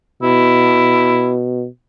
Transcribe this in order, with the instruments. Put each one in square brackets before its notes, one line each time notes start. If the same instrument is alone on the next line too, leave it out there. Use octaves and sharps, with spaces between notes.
[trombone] B2 [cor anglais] E4